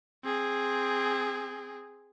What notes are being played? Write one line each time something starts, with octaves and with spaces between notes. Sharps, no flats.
C4 G#4